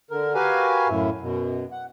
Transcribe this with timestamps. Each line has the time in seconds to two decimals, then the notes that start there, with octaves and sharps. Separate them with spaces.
0.11 D3 A#4
0.35 F#4 G4 A#4 B4 F5 G#5
0.88 F#2 A2 E4
1.21 F#2 B2
1.72 F#5